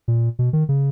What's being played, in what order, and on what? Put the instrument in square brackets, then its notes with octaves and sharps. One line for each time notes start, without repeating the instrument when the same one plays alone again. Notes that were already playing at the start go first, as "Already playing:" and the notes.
[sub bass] A#2
B2
D#3
C#3